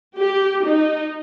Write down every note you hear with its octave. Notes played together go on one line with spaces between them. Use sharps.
G4
D#4